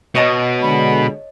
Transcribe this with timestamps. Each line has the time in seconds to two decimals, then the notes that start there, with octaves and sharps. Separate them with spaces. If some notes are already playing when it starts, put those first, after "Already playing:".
0.15 B2 C#5 D#5 A5
0.62 D3 G#3 B5